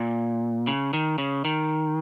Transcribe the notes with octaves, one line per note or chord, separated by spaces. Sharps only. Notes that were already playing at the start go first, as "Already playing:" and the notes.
Already playing: A#2
C#3
D#3
C#3
D#3